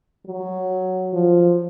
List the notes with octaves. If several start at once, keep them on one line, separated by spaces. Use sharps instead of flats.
F#3
F3